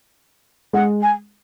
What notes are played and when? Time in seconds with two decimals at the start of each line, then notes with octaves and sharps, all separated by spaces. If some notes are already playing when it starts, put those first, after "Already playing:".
0.73 G#3 F#5
1.02 G#5